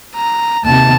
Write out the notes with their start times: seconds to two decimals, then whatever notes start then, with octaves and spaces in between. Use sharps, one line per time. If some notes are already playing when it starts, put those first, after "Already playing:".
0.16 A#5
0.65 D#2 C3 A5